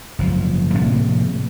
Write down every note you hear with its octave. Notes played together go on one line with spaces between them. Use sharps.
F#1 F3
A2 C3 F3 A#3